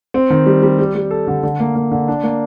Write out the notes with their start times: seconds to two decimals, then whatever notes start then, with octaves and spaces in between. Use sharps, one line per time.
0.14 C4
0.30 D#3
0.46 G3
0.63 G3
0.79 G3
0.95 G3
1.11 A4
1.27 D3
1.43 D3
1.60 A#3
1.75 A#3
1.92 D3
2.08 D4
2.23 A#3